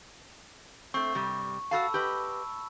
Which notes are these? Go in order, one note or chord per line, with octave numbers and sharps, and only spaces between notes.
A3 C4 C#6
G2 C3 G3
F#4 A4 F5 A5 B5 E6
G4 B4 D#5